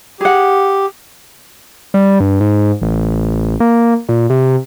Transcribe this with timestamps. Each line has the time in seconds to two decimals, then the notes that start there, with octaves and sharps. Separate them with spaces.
0.21 G4 G#4 F#5
1.94 G3
2.20 G2
2.41 G#2
2.82 A1
3.60 A#3
4.09 A#2
4.30 C3